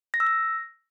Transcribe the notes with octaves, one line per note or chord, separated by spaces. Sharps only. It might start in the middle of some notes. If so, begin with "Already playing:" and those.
A#6
E6
A#6